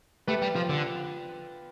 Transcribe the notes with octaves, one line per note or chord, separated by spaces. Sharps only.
A3 G4 B4
G3
F3 F4
D3